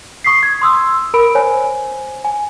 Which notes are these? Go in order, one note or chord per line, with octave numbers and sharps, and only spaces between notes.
C#6 D#6 B6 C7
G#6
C6 D#6 E6
A#4 B5 D7
C5 C#5 G#5
G#5